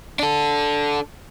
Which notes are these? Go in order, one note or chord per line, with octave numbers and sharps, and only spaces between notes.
D4 A4